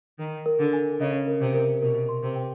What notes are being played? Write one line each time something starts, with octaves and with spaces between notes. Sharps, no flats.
D#3 A#4
A#4
D3
G#5
C#3 D#5
A#4
C3
A#4
B2 A#4
C6
C3
G5